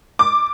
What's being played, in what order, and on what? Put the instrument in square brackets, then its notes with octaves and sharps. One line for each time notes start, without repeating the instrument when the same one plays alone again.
[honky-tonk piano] D6